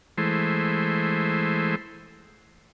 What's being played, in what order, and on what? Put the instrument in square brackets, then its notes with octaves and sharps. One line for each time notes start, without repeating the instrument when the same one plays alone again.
[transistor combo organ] E3 G#3 A3 C5